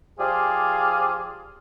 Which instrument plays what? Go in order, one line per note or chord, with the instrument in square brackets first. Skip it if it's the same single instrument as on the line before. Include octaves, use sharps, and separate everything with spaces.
[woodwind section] F3 G4 G#4 C5 D5 F5